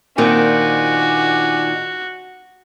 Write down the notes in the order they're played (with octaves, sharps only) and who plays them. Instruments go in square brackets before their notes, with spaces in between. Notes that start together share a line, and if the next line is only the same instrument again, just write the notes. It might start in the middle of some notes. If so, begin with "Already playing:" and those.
[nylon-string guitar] A#2 D#3 C4 [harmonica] D4 D5 G#5 [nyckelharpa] F#4